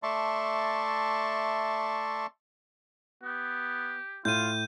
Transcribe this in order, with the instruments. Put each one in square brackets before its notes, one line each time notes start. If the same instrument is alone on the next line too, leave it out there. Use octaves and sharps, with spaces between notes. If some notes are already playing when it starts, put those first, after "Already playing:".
[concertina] A3 D5 E5 A5 C6 C#6
[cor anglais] B3 [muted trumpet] G4
[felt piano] A2 [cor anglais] F4 [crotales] G6 D#7